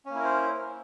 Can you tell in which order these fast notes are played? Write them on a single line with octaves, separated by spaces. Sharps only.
C#4 A#3 E4 A#4 C5